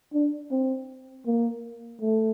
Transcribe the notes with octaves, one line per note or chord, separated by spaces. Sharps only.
D4
C4
A#3
A3